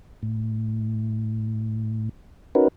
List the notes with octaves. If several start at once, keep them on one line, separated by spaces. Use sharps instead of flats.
A2
C#4 D#4 F#4 A#4 B4